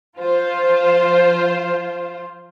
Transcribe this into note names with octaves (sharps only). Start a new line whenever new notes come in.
F3 F4 C5